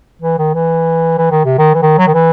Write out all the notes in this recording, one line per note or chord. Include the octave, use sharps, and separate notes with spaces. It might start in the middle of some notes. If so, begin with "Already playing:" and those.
E3
D#3
E3
E3
D#3
C3
D#3
E3
D#3
F#3
D#3
E3